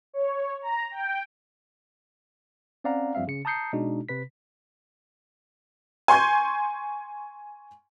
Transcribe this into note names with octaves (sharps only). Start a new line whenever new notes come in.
C#5
A#5
G5
C4 C#4 D5 F5 F#5 A#5
G2 F3 G3 C4 E5 F5
C#3 C#7
A5 A#5 D#6 G6 C7 C#7
B2 G#3 D4 D#4 F#4
C3 B4 B6
G#5 C6 C#6 G6 G#6